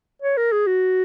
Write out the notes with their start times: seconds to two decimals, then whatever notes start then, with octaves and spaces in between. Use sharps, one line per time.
0.22 C#5
0.37 A#4
0.52 G#4
0.67 F#4